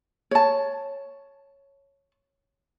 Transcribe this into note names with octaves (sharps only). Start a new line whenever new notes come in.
C#5 A5